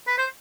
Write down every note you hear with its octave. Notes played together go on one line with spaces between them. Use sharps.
B4
C5